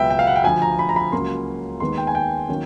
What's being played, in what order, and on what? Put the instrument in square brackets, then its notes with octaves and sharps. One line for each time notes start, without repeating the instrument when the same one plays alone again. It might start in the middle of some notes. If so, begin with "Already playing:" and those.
Already playing: [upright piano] C#2 B2 F#3 B3 E5 G5
G5
F5
F#5
G5
D2 D3 F3 G#5
A#5
B5
A#5
B5
C#2 C#3 F#3 A#3 C#4 C6
D#2 D#3 G#3 B3 C6
G5
G#5
G5
D#3 F#3 A#3 C#4